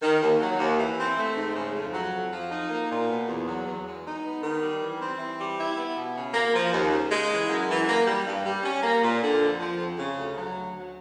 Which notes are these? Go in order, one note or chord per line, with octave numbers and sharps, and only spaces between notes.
D#3
D#2
F#3
D#2
E3
C4
A3
G#2
C#3
F2
F#3
F2
F3
D#4
A#3
A#2
B2
E2
F#3
E2
G#3
D#4
B3
D#3
G3
E3
C4
E3
G3
E4
B3
B2
C#3
A#3
F3
D#2
C#3
G#3
E3
F#2
E3
A#3
G3
G2
G3
C#4
A#3
A#2
D3
F2
F3
F2
C#3
D2
F#3
D2
F#3